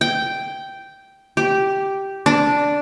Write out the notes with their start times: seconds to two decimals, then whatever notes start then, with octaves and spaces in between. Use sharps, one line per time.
0.01 G5
1.37 G4
2.26 D4